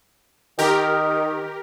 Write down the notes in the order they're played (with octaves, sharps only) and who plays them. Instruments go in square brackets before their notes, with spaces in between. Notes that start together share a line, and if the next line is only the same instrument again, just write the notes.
[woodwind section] D#3 [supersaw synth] G4 A#4